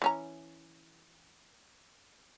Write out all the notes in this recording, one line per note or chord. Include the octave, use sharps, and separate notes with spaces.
E3 C#4 A#5